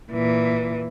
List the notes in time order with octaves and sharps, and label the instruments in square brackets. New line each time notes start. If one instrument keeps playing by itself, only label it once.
[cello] A#2 E3